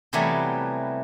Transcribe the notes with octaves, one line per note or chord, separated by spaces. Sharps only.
C3 E3 F#3 G3 A3 B3